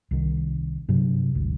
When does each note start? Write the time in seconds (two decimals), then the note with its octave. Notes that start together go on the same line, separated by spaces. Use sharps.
0.11 C2 D#3
0.88 G2 C3 F#3
1.35 G#1 D2